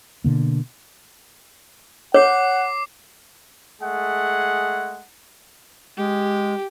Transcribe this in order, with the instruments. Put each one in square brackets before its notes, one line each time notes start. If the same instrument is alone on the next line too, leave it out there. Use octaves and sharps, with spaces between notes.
[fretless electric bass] B2 D3 A#3
[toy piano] C#5 [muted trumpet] F#5 [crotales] D6 C7
[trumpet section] G#3 A3 G#4 F#5
[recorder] G#3 [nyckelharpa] G4